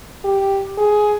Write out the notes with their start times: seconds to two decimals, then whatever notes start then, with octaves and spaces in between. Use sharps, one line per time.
0.24 G4
0.78 G#4